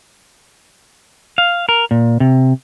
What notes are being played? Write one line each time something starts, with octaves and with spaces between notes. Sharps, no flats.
F5
A#4
A#2
C3